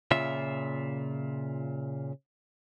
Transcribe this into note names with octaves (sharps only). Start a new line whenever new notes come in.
A#2 C#3 F4 E5